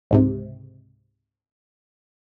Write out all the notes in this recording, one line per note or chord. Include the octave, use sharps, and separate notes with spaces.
C#2 G#2 C3